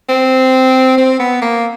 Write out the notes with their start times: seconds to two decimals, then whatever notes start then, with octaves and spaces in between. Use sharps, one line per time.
0.09 C4
0.98 C4
1.20 B3
1.42 A#3